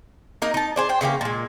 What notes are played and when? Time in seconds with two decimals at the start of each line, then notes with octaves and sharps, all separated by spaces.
0.42 A#3 D#4 A#4 D#5
0.54 D#4 A5
0.76 G#4 C5 D5
0.89 C5 G5
1.01 C#3 E3 A#3 G4
1.21 A#2 G#3